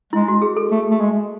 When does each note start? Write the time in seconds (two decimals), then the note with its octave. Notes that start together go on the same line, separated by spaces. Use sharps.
0.13 G#3 E4
0.28 F#4
0.42 G#4
0.57 A4
0.71 A3
0.91 A3
1.01 G#3